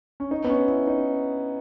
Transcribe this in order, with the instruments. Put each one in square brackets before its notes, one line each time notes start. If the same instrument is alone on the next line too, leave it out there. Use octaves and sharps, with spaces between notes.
[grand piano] C#4
D#4
B3
C#4
E4
D#4